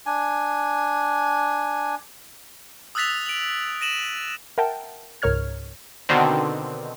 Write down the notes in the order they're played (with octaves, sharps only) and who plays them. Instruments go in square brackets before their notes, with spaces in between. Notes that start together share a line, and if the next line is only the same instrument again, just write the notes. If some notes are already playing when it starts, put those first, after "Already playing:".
[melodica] D4 G#5
[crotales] D#6 E6 F#6 A6 B6 F7
D7 F#7
A#6 D#7 E7 F#7
[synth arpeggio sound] A#4 E5 F#5 G5 A5
C#2 G#2 A#4 C#5 F6 G#6
[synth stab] B2 D3 D#3 C4